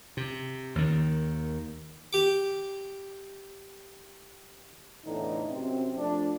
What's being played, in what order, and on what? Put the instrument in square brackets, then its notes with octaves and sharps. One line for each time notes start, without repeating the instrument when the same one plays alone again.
[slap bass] C3
D#2 D#3
[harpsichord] G4 D6
[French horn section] E2 A2 D3 E3 D#4
F#2 C3 C4
F2 F3 A3 D4